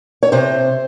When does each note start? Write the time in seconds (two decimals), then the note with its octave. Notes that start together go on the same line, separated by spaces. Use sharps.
0.23 C#5
0.32 C3 C5